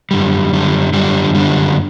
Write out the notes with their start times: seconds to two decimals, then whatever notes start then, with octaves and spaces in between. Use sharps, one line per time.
0.11 F#2 D3 G3
0.53 F#2 D3 G3
0.93 F#2 D3 G3
1.35 F#2 D3 G3